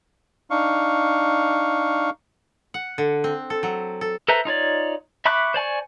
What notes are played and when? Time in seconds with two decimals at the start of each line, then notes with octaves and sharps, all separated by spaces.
0.50 D4 D#4 F5 C#6
2.74 F#5
2.98 D3
3.24 C4
3.50 A4
3.63 F#3
4.01 A4
4.28 A4 B4 C5 E5 A#5
4.45 D#4 F4 C#5 D5
5.25 E5 B5 C#6 D6 F#6
5.54 C5 D5 G#5 C#6